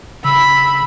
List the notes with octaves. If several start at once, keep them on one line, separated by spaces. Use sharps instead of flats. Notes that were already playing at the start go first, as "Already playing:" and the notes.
C#3 B5 E6